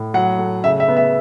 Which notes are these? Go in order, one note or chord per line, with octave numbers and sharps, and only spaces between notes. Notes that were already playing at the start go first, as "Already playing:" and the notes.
Already playing: A2
F#3 F#5
A3
C#3 E5
E5
B3
E5